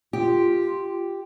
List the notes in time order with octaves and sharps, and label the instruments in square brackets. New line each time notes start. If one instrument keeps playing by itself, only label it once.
[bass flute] F4 [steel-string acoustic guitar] G4